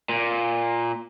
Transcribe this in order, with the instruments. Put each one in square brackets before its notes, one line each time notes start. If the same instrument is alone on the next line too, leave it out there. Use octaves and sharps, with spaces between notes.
[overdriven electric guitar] A#2